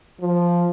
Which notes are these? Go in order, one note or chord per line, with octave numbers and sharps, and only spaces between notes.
F3